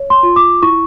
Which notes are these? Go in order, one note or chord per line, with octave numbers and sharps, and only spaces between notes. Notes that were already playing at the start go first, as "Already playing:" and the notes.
Already playing: C#5
C6
F4
D6
E4 C#6